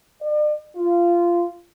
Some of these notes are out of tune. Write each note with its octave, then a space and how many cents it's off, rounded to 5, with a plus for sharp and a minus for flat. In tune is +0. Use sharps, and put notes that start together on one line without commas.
D5 +40
F4 -15